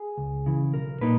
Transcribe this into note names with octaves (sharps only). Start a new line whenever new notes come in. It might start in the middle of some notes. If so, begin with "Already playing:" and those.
Already playing: G#4
C#2
C#3 E3
B1 A#4
A#2 A#3 D#4 B4